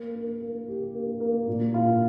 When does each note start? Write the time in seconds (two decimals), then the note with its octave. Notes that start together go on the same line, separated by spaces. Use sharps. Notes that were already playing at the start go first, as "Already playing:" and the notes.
Already playing: A#3
0.15 A#3
0.41 A#3
0.68 G4
0.95 A#3
1.20 A#3
1.48 A#2
1.74 F4